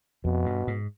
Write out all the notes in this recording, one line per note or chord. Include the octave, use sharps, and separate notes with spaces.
F2 B2
G2
G#2